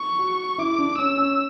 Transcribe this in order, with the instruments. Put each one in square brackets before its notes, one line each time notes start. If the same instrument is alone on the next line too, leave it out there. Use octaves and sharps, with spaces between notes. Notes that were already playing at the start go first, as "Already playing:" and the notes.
Already playing: [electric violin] C#6
[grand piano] F#4
[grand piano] E4 [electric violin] D6
[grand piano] D4
[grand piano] C#4 [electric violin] E6
[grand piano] C#4